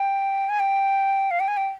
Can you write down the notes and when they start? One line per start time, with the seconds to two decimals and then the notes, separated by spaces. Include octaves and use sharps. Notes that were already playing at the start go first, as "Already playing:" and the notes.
Already playing: G5
0.49 G#5
0.60 G5
1.31 F5
1.40 G5
1.48 G#5
1.57 G5